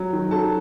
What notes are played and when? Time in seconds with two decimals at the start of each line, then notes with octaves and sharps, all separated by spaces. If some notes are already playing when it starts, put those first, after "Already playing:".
Already playing: F#3
0.13 D#3
0.31 F#3 A4 A5
0.42 A5